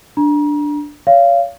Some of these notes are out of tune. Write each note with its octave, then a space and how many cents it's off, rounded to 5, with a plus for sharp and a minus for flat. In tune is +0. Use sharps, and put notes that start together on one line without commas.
D4 +0 A#5 +35
C#5 +30 F5 -20